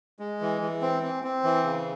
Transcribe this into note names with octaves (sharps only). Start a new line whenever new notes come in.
G#3
E3
E3
C4
C4
C4
E3
C#3